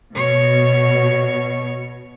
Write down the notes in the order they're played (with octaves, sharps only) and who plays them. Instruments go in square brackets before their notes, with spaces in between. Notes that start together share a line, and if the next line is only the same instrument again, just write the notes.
[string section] B2 [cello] C#5